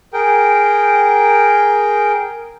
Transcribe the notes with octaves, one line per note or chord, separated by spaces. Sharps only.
G#4 A#4 G5